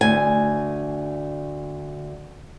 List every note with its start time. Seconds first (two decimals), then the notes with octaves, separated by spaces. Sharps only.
0.01 D2 G#5